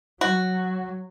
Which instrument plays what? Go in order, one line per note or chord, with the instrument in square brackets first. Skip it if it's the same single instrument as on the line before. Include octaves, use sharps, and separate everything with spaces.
[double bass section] F#3 [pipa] F#4